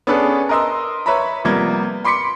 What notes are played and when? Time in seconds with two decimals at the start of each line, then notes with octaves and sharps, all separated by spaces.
0.07 B3 C#4 D4 G#4 A4 B4
0.49 A#4 B4 D#5 C6 E6
1.06 B4 C#5 E5 A#5 B5
1.44 C3 F3 G3 A#3 B3 G#6
2.04 B5 C6 D6 B6 C#7